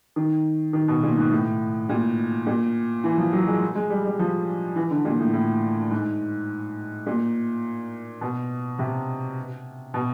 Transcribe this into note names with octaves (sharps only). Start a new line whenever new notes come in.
D#3
D#3
B2
A#2
G#2
A2
A#2
A#2
E3
F3
F#3
G#3
G#3
G3
G3
F3
E3
D3
A#2
A2
A2
G#2
A#2
B2
C3
B2